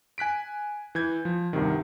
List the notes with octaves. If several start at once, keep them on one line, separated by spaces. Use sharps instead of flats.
G#5 F#6 B6 D7
E3 G6 G#6
F3
C2 G2 C3 D#3